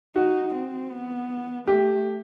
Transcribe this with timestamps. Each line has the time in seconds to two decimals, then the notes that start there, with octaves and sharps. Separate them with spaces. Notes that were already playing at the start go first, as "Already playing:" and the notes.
0.15 D#4 F#4
0.54 C4
0.91 B3
1.67 A3 G4